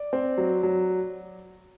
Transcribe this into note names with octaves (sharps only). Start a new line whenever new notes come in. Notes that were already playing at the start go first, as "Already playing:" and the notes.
Already playing: D5
C4
F#3
F#3